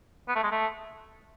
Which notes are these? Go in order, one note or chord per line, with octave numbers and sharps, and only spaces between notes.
B3
A3
G#3
A3